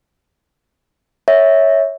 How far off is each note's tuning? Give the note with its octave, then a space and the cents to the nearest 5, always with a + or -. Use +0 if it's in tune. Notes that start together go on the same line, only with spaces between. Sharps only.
C#5 +0 E5 -20